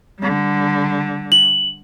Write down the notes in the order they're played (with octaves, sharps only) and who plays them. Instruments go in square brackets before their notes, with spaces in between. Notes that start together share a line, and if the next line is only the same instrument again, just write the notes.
[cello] D3 G3
[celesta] F#7